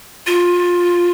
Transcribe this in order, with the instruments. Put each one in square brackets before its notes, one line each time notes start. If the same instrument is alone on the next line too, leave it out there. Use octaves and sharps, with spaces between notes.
[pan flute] F4